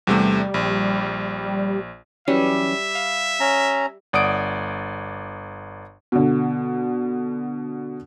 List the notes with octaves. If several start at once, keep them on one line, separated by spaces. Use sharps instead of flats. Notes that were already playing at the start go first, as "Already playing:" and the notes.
E2 C3 G3 A3
A#1
E3 F#3 G3 C#4 E5
F5
C#4 A#5
G1 D5 F#5 D#6 D7
B2 D3